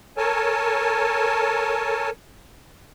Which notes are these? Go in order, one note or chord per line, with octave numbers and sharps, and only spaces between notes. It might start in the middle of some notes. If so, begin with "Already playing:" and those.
A4 A#4 C#5 G#5 A5